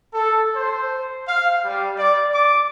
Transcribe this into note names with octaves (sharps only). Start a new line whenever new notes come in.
A4
C5
F5
G3
D5
D6